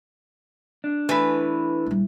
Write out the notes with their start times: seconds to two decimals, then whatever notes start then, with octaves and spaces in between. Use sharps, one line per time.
0.84 D4
1.09 E3 A3 B4
1.86 A#1 G3